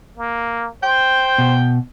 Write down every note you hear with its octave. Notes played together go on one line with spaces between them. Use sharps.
A#3
C5 G5
B2